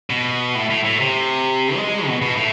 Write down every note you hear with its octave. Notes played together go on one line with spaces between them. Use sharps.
B2
A2
A2
A2
C3
G#3
B2
B2
A2